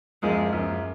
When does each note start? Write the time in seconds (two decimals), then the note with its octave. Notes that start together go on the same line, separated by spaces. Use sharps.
0.22 F#2 F3 G#3 A#3
0.53 F#2 F3 A#3